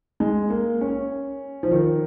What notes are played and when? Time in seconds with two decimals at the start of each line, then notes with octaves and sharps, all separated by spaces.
0.20 G#3
0.50 A#3
0.81 C#4
1.63 F3
1.71 D#3